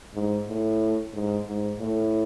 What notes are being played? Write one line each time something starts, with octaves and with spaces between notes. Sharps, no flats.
G#2
A2
G#2
G#2
A2